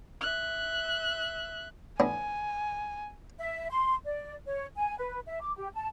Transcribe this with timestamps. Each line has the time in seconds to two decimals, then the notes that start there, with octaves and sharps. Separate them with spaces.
0.21 E5 F#6
2.00 A2 B3 D4 G#5
3.38 E5
3.70 C6
4.04 D5
4.46 C#5
4.75 G#5
4.98 B4
5.26 E5
5.41 D6
5.56 G4
5.74 A5